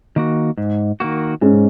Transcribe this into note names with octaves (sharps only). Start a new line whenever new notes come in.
D#3 A#3 F#4
G#2
D#3 A#3 F#4
G#2 G#3 C#4